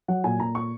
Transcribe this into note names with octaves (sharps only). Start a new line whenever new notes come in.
F#3 F#5
A#2 G#5
A#2 A#5
C#6